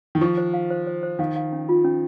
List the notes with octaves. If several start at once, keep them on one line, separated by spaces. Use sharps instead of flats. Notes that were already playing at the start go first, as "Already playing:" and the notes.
D#3
F3 C#6
C5
F5
C5
C5
C5
D#3 F5
F5
C#4
F4
C#4